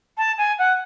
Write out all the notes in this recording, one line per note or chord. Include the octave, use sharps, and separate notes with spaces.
A5
G#5
F#5